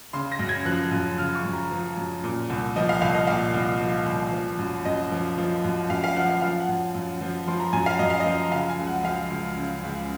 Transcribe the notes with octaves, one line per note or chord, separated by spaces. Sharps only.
C#3 C6
A#6
F#2
G#6
F3 F#6
F#2
C#3 F6
C#6
F#2
A#5
F3
F#2
A#2
C2
F3 D#5
F5
C2 F5
D#5
A#2 F5
C2
F3
C2
F3
F#2
F#2 D#5
F3
F3
F#2
F#2 F5
F5
F3 F#5
F5
F3 F5
F#5
F#2
F#2
F3
F3 C6
A#5
F#2 G#5
F5
F#2 D#5
F5
D#5
F3
C#3 F5
G#5
C#2
F#5
F3 F5
C#2
C#3
C#2